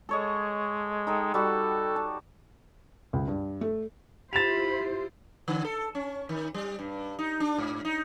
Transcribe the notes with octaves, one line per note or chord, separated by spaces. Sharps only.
G#3 A4 C#5 D#5
D#4 A4 G5
G3 F#4 A4 F#5
A5
C#2
G2
A3
E4 F4 G4 C5 B5 A6 E7 F7
D3
A4
C#4
D#3
G3
G2
D#4
D4
G#2
D#4